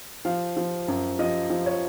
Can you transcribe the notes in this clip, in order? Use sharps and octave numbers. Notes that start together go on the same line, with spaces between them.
F3 F5
F3
F#2
F3 D#5
F3
C#5